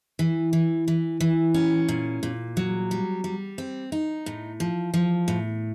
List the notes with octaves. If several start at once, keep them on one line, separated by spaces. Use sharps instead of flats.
E3
E3
E3
E3
C#4
A#2
A#2
F#3
G3
G3
C4
D#4
A2
F3
F3
A2